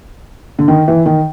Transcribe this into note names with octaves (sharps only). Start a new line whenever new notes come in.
D3
D#3
E3
D#3